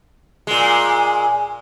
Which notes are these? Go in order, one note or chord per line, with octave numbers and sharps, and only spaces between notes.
A#2 G#3